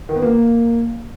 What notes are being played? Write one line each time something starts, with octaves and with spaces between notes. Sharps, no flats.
D#3
B3
A#3